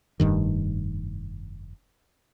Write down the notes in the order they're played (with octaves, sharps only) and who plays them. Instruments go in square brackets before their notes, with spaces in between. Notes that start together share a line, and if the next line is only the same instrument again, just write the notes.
[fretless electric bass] F1 G2 D#3